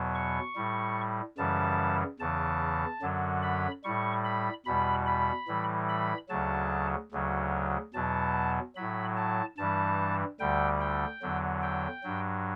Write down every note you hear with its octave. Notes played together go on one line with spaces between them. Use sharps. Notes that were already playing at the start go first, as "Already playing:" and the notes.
Already playing: E2 B2 F#3
C#6
A2 G3
F#2 C#3 E3 G3 A5
E2 C#3 E3 A5
F#2 D3 F#3
B5
A2 G3 C#6
B5
E2 B2 G3 B5
B5
A2 E3 G3
B5
D2 C#3 F#3 A5
D2 C#3 F#3
E2 B2 F#3 A5
A2 F#3 B5
A5
G2 E3 G3 A5
D2 D3 G3 G5
G5
E2 D3 F#3
G5
G2 F#3